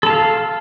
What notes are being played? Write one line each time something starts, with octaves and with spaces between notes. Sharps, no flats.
A4 F5 A5